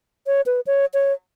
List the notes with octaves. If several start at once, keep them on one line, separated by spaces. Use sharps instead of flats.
C#5
B4
C#5
C#5